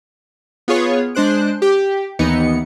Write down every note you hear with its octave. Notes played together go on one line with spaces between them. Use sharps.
B3 F4 G#4 C#5
G#3 D4 C5 F#6 D7
G4
D#2 E3 B3 D#4 C#7